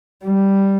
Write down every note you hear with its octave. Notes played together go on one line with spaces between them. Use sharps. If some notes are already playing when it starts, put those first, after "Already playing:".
G3